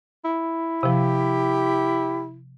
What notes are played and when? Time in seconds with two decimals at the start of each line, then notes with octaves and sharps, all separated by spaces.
0.25 E4
0.83 C3 F3 G4